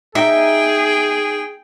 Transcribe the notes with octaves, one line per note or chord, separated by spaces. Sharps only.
D#4 G#4 E5 G5